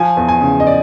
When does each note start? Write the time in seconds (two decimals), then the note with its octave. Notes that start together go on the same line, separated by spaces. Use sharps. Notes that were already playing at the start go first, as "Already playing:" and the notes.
Already playing: F3 G#5
0.17 E2
0.28 G#5
0.41 C#3
0.60 D#5
0.67 D5